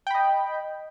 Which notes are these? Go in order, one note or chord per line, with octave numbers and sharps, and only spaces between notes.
D#5 G5 B5